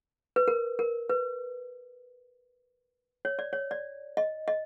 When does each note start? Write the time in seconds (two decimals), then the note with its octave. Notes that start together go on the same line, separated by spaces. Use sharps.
0.36 B4
0.48 A#4
0.79 A#4
1.09 B4
3.25 C#5
3.39 D5
3.53 C#5
3.71 D5
4.17 D#5
4.48 D#5